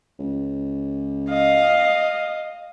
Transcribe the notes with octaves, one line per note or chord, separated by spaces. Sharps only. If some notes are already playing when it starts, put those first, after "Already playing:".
C#2
D#5 F5